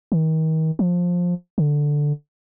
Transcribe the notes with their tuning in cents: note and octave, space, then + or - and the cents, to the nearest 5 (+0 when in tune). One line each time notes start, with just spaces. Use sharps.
D#3 +35
F3 +15
D3 +0